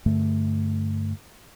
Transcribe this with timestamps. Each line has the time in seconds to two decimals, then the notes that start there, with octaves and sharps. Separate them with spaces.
0.06 G2 D3 A3